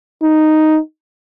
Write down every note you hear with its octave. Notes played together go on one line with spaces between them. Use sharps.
D#4